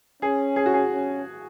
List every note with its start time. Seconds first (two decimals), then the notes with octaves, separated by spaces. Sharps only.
0.22 C#4 G#4
0.56 G#4
0.66 F#4
0.73 G#4
0.92 C#4